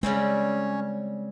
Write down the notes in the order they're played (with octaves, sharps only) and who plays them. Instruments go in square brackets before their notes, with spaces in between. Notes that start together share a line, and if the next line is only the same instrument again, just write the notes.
[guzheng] C#3 G3 C4 [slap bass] G#3 [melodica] C#4